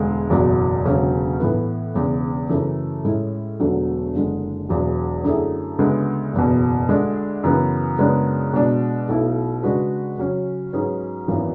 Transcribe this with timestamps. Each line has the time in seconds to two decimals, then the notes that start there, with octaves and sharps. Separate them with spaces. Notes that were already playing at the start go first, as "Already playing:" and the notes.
Already playing: E1 D2 D3 G#3
0.30 F#1 E2 B2 F#3
0.85 E1 D2 C#3 F#3 C#4
1.40 A2 E3 B3
1.94 E1 E2 C#3
2.49 F#2 C#3 E3 A3
3.05 A2 G#3 C#4 E4
3.60 E1 E2 D3 F#3 A3
4.14 F#1 F#2 D3 G#3
4.69 E1 E2 B2 F#3
5.24 F#2 D3 A3 E4 G#4
5.79 D2 C#3 G#3 B3
6.33 F#1 E2 B2
6.89 D2 D3 G#3 D4
7.43 F#2 C#3 E3 B3
7.99 F#2 C#3 G#3 B3 D4
8.53 B2 G#3 D4
9.08 B1 B2 A3 E4
9.63 C#3 G#3 D4 F#4 B4
10.18 C#3 F#3 C#4
10.73 G#2 F#3 C#4 G#4 B4
11.28 G#1 F#2 E3 B3